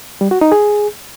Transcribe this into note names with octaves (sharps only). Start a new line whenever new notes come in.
G3
F#4
D#4
G#4